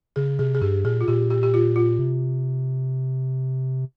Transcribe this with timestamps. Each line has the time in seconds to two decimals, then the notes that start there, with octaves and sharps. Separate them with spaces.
0.16 C#3 G#4
0.39 C3 G#4
0.55 G#4
0.62 G2 G4
0.84 A#2 G#4
1.01 F4
1.08 A#2 G4
1.30 G4
1.43 G4
1.54 F4
1.76 F4
1.99 C3